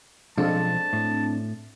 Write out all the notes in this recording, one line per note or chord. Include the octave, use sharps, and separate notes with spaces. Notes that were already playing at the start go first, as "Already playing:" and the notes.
B1 F3 G#3 C4 D4 F4 A4 A5
A2